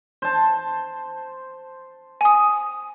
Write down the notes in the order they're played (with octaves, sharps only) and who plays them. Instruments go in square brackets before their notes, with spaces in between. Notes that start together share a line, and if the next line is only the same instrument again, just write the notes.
[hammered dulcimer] C5 A5
[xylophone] G#5 D#6